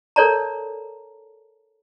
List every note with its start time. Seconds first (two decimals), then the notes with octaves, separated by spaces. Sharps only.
0.16 A4 A#4 C#5 D5 A5 A#5